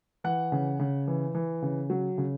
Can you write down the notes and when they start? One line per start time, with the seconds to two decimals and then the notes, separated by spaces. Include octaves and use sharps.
0.24 E3 F#5
0.52 C#3
0.79 C#3
1.08 E3
1.35 E3
1.62 C#3
1.90 F#3
2.18 C#3